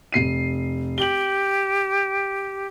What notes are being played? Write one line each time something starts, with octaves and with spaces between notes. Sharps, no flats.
F1 C7 D#7
G4 F#7 G7